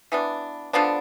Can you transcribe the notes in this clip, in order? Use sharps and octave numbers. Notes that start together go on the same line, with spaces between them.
E3 B3 D4
D3 F3 B3 D4